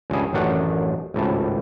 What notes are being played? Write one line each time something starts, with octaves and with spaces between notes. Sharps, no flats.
C#2 G2 G#4
A1 F#2 D#3 D4 F#5
G#1 C#2 A2 A5